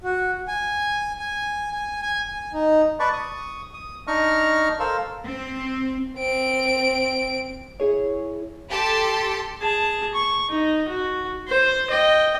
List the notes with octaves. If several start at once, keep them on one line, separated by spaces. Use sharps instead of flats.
F#4
G#5
G#5
G#5
G#5
G#5
D#4
B4 D5 A5 B5 C#6
C#6 D#6
D#6
D4 D#4 A#5 C#6 F6
A4 A#4 C5 F5 E6
C4
C4 D7
E4 G#4 C#5
G4 A4 A5 C6
G#4 A5
C#6
D#4
F#4
C5
D#5 G5